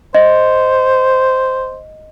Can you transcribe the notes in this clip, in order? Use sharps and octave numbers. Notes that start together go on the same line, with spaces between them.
C5 D#5